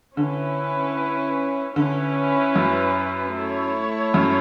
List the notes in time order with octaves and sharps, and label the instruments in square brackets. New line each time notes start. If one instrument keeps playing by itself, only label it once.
[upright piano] D3 [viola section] C#4 E4 B4
[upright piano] D3 [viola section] C#4 E4 B4
[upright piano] F#2
[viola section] A3 E4 A4 C#5
[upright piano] F#2